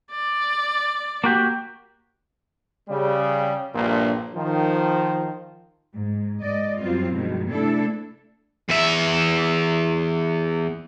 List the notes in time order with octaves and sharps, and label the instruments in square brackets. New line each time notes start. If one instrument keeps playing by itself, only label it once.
[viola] D5
[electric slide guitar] A#3 F#4 G4
[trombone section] C#3 G3
A#1 G2 A#2
D#3 F3
[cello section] G#2
G#2 D5 D#5
F#2 F#3 G3 C4 F4
G2 B2 D#3 F3 G#3
C3 A3 D4 E4 A4
[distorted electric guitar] E2 E5